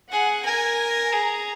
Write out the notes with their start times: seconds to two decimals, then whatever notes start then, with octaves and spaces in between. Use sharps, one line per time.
0.11 G#4 F#5
0.45 A#4 G#5
1.12 G#4 A#5